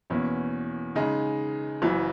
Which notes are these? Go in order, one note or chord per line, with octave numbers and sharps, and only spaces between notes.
E2 B2 A#3 C#4 E4
C#3 G#3 D#4
F#1 F#2 E3